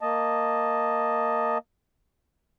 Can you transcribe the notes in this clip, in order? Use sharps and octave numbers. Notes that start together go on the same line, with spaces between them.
A#3 D#5 A5